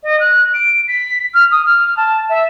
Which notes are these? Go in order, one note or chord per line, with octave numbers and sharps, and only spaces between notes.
D#5
F#6
D7
B6
F6
D#6
F6
A5
E5